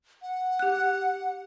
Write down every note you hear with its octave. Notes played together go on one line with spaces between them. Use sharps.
F#5
G4 F#6